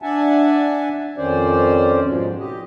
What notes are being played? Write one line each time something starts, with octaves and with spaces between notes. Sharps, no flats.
D4 E5 F#5 G#5 A5
F2 D#3 C#4 C5 D5
G#2 B2 F3 G#3
G4 D#5